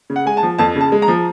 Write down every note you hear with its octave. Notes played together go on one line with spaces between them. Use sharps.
C#3
F#5
G#3 G#5
A5
F3
F2 A5
C#3
A5
G#3
A#5
F3